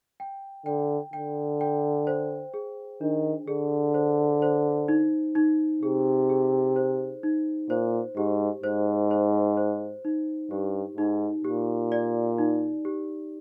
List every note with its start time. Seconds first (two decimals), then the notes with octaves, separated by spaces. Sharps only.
0.20 G5
0.66 D3 G5
1.13 D3 G5
1.61 G5
2.07 C5
2.54 G#4
3.01 D#3 D4
3.48 D3 G#4
3.94 C5
4.42 C5
4.88 D#4
5.35 D#4
5.83 C3 G#4
6.30 G#4
6.76 C5
7.23 D#4
7.70 A#2 C5
8.17 G#2 G4
8.64 G#2 C5
9.11 C5
9.57 C5
10.05 D#4
10.51 G2 G4
10.97 G#2 D#4
11.44 A#2 G4
11.92 D5
12.38 D#4
12.85 G4